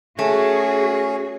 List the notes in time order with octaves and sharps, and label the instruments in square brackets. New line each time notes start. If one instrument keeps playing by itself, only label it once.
[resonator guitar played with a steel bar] A3 [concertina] C#4 [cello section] F#4 G#4